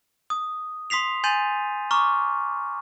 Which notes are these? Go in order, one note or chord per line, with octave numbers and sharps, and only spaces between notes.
D#6
C6 D#6 B6 C7 F7
G#5 C6 G6 A6 D#7 F7
A#5 C#6 D6 F6